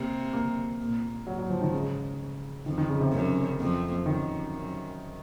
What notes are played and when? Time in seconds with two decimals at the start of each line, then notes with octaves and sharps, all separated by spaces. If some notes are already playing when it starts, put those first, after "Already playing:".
Already playing: C3 A#3
0.33 A#3
0.80 A#2
1.27 G#2 F#3
1.39 F#3
1.50 F3
1.61 D#3
1.73 C#3
2.66 F2 D#3
2.78 D#3
2.89 C#3
3.01 C3
3.13 F#2
3.60 F2
4.05 F#2 D#3
4.52 F#2